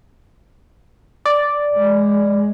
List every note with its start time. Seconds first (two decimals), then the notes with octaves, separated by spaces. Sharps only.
1.25 D5
1.75 G#3